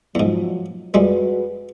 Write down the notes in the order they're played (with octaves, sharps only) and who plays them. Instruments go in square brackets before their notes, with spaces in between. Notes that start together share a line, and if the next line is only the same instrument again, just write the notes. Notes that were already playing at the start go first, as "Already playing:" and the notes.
[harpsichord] E2 G#2 [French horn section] F3 F#3
[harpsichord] F2 G3 G#3 [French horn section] F#4 G#4 B4